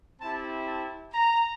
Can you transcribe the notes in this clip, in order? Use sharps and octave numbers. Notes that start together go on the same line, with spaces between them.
C4 E4 G4 A5
A5
A#5